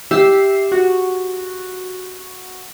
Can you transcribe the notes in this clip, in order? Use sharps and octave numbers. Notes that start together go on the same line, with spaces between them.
G4 E5 E6 C7
F#4